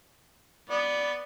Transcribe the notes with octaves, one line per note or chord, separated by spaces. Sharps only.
B3 D5